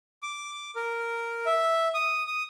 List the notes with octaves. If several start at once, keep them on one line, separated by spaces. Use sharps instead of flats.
D6
A#4
E5
D#6
D#6